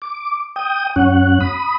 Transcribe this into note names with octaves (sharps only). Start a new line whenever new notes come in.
D6
G5 D#6
F#2 C#4 F#5
B5 D#6